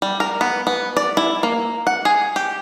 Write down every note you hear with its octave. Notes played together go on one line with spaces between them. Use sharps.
G3
A#4
B3
B3
D5
E4
A#3
F#5
G#4
G4